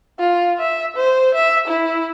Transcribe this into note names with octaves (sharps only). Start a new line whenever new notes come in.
F4
E5
C5
E5
E4